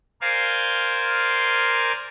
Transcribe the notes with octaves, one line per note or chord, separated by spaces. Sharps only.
A#4 C5 D5 F5 G#5 C6